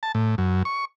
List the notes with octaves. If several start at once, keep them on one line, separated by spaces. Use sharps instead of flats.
A5
A2
F#2
C#6